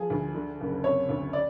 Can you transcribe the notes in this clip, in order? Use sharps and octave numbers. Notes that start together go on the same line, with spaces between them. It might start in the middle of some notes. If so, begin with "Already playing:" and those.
Already playing: F3 G#4
D2
D3
F#1
C3 C#5
D2
D5